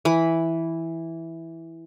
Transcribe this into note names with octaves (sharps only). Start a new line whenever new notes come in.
E3 B5